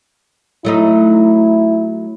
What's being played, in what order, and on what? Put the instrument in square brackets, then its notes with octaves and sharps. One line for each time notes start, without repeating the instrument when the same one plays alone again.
[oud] F#3 A3 D#4 [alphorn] E4